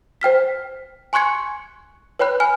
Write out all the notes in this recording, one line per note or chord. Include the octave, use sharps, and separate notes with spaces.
C5 G5 F6 B6
G#5 C6 C#6 F#6 G#6 C#7
B4 C#5 G5 B5 F#6
G#5 F6